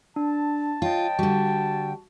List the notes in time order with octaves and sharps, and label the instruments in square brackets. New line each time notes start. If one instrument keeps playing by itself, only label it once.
[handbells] D4 [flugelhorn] A5
[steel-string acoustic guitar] F4 [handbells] C#5 D#5 [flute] G5
[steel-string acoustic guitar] D3 G3 [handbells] F#4